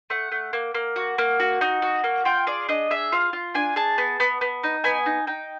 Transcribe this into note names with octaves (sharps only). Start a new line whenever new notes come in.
A3 F#5
A3
A#3
A#3
F#4
A#3
F#4
D#4
F#4
A#3
F4 G5
G#4 D5
D4 D#5
G#4 E5
F4 F5
F4
D4 G#5
G#4 A5
B3
B3
B3
D#4
B3 G#5
D#4
D#4 G5